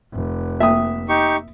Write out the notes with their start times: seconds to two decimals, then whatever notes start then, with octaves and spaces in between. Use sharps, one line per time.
0.12 F1
0.60 A#3 E5 G5 D#6
1.09 D#4 G4 C#6